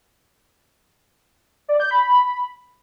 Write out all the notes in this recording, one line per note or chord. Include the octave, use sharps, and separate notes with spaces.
D5
G6
B5